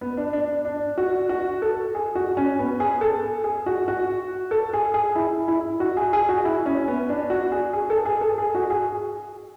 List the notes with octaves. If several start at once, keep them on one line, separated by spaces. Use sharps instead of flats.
B3
D4
D4
D4
F#4
F#4
A4
G#4
F#4
C#4
B3
G#4
A4
G#4
F#4
F#4
A4
G#4
G#4
E4
E4
F#4
G#4
G#4
F#4
E4
C#4
B3
D4
F#4
G#4
G#4
A4
G#4
A4
G#4
F#4
G#4